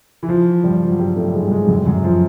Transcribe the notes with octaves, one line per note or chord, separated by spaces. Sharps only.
E3
F3
G2 G3
F3
F#3
G2 G3
A2 A3
G#2 G#3
G3
G#2 G#3
F#2 F#3
F#2 F#3
F3